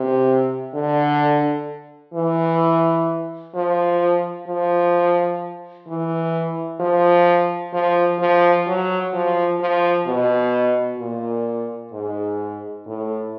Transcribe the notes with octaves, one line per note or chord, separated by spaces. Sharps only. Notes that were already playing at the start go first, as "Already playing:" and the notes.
Already playing: C3
D3
E3
F3
F3
E3
F3
F3
F3
F#3
F3
F3
B2
A#2
G#2
A2